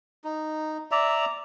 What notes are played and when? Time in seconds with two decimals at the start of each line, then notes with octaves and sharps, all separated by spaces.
0.24 D#4
0.91 D5 E5 A#5